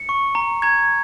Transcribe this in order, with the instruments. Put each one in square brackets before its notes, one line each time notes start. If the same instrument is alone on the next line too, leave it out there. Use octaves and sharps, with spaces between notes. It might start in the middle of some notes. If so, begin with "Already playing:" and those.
Already playing: [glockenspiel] C#7
C#6
A#5
[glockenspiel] A#5 [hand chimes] G#6